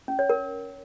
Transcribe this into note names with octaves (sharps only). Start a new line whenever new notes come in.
C#4
C#5
A#4